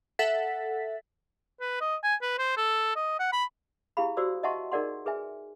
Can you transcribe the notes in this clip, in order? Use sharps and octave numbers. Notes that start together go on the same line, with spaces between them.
A4 E5 F#5 A6 B6
B4
D#5
G#5
B4
C5
A4
D#5
F#5
B5
E4 G4 G#4 F5 B5
F#4 G4 C5 D5 D#6 E6
D#5 E5 F#5 A5 C6 C#6
D#4 G#4 A#4 D5 F#5 C6
G#4 B4 E5 G#5